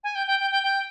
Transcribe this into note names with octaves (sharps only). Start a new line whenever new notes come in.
G#5
G5
G5
G5
G5
G5